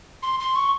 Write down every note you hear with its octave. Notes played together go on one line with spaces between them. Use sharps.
C6
C6
C#6